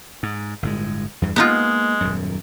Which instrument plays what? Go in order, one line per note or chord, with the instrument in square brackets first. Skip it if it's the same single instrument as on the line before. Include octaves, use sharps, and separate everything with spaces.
[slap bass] G#2
G1 A2 G#3
E2 G2
[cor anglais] G#3 [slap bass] A#3 [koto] B3 D#4 F4
[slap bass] D#1 F#2